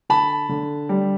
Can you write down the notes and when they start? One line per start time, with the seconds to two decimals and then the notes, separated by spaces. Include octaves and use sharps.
0.09 D3 A5 B5
0.49 D3
0.89 G3